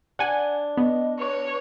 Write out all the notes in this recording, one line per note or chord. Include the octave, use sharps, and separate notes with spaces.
D4 F#5 G#5
B3 D#5
B4 C#5